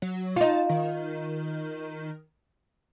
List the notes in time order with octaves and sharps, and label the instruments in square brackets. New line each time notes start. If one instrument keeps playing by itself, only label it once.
[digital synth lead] F#3
[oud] D#4 F4 [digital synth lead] A5
[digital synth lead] D#3